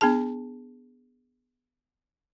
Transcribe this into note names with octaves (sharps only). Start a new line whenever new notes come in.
B3 D4 G#4 A5